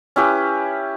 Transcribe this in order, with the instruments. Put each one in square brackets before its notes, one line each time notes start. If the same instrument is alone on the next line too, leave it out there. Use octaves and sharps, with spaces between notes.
[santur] C#4 E4 G4 B4